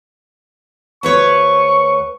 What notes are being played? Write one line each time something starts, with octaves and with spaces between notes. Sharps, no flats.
D2 B4 C#5 C#6